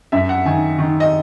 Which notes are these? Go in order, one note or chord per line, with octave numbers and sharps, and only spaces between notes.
F#2 E5
F#5
D#3 G#5
D#3
D#5